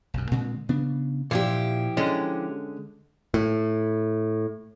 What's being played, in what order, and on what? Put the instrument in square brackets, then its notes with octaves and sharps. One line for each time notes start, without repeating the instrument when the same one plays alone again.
[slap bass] B1 F#2
A#2 D3 G#3 C4
C#3 B3 D4
[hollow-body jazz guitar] A#2 [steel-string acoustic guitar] F3 E4 G4
[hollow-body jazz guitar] D3 G#3 C#4
[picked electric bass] A2